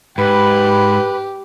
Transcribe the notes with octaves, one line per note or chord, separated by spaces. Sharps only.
G#2 G4 B4 B5